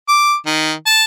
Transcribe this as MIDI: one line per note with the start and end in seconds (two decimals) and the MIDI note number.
0.08 0.34 86
0.46 0.72 51
0.86 1.04 81